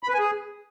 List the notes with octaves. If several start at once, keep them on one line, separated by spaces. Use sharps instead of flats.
B5
B4
G#5
G#4